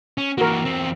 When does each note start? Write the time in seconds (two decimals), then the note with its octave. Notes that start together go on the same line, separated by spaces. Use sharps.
0.18 C#4
0.38 E3 A#3 F#4 A#4
0.65 E2 C4